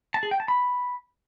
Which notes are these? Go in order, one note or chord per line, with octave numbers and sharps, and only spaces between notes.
A5
G#4
G5
A5
B5